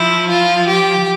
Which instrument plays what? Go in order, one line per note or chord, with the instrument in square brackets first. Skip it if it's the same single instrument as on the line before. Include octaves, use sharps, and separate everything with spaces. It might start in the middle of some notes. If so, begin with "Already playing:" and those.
Already playing: [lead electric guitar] F3 [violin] E4
[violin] F4
G4